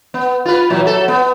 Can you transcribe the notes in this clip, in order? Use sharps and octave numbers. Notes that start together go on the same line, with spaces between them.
B3
F4 B4
A#2 E3 F#3
F#3 A4
B3